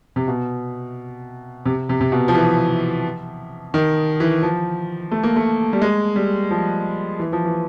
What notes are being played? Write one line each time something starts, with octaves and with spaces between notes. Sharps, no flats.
C3
B2
C3
C3
C3
B2
F3
E3
D#3
E3
F3
A3
A#3
A3
G3
G#3
G3
F3
E3
F3
E3